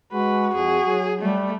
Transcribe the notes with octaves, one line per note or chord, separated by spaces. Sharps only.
G#3 F#4 B4
F2 G#4
F#3
G3 A3